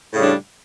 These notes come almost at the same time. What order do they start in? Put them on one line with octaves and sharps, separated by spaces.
A2 C#3 G3 D4